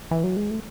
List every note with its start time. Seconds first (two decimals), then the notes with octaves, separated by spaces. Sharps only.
0.11 E3
0.24 F#3
0.36 G#3
0.51 A3